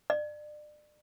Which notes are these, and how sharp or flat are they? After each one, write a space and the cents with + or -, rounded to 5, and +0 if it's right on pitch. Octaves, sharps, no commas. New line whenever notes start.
D5 +30